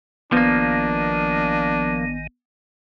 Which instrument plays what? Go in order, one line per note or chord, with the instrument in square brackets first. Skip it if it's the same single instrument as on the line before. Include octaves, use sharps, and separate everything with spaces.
[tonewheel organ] G#1 D#3 [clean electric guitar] F3 A#3 [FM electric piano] B3 [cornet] D4